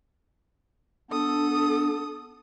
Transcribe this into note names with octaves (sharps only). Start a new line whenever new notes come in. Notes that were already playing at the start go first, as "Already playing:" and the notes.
B3 D4 A4 D#6